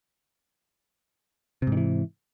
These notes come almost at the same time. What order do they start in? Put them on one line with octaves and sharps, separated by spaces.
C3 G#2 D#3 E3